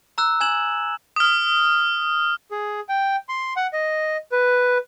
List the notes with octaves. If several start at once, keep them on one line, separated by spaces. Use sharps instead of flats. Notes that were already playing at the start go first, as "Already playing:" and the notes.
A#5 E6 F#6
G#5 G#6 E7 F#7
D#6 F6
G#4
G5
C6
F#5
D#5
B4